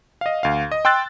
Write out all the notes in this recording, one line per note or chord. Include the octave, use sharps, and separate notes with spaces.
D#5 F5
D2 F5
D#5
G5 C6 E6 F#6 A6